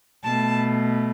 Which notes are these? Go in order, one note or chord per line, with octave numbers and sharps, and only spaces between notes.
B2 A3 A5